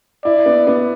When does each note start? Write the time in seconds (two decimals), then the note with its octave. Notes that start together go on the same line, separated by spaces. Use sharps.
0.25 E4 D5
0.46 B3
0.67 B3